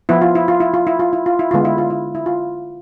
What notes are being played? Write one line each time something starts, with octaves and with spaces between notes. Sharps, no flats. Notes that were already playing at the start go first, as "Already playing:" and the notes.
F3 B3 E4
F4
E4
F4
E4
F4
E4
F4
E4
F4
E4
D3 G#3 B3 F4
E4
F4
E4
E4
F4